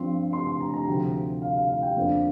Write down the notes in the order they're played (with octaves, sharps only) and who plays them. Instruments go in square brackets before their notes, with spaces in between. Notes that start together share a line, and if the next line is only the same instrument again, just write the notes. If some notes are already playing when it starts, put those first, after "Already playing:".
Already playing: [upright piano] G2 F3 C4 C6
C6
C6
A#5
A#5
D2 C3 F3 G5
F5
F5
F5
G5
F2 D3 A#3 D4 F5